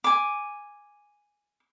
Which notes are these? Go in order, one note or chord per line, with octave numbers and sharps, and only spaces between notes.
G#5 D6